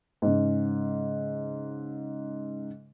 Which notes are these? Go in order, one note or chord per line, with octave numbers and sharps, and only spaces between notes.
G#2 C#3